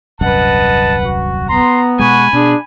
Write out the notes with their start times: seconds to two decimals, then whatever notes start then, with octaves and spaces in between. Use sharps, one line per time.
0.21 D#1 C2 F#2 B4 D#5 F#5 A5
1.06 F#4
1.49 B3 A#5 C6
1.99 B2 G#3 F#5 G#5 B5 C#6
2.33 B2 D4 G#4